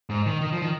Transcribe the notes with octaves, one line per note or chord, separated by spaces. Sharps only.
G#2
D#3
D#3
F3
D#3